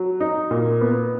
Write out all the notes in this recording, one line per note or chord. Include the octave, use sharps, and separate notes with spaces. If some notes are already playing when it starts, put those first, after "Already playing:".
Already playing: F#3
D#4
A#2
B3